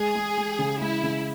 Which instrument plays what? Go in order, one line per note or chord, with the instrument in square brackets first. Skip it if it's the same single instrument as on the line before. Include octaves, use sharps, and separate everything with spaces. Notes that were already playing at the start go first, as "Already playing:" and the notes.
Already playing: [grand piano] G#3 [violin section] G#4
[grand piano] G#3
G#3
C#3
[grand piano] G#3 [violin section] E4
[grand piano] C#3